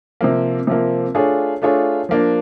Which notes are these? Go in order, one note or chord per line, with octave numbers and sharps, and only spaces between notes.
C3 F3 A#3
C3 F3 A#3
A3 D4 F4 G#4 C#5
A3 D4 F4 G#4 C#5
F3 A#3 D4